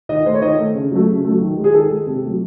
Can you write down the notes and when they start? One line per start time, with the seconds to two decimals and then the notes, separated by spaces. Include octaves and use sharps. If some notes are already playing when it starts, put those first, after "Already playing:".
0.09 D#3 D#5
0.26 A3 C5
0.34 C#5
0.42 D#3 D#5
0.58 A3
0.75 C#3
0.91 F#3 A3
1.08 C#3
1.25 F#3 A3
1.41 D#3
1.57 G#3
1.64 G#4
1.74 D#3 A4
1.90 G#3
2.07 C3
2.23 F#3 A3